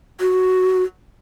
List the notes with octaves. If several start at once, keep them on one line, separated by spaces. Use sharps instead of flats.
F#4